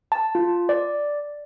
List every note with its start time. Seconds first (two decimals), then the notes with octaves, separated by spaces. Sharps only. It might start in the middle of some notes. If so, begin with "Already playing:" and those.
0.12 A5
0.35 F4
0.69 D5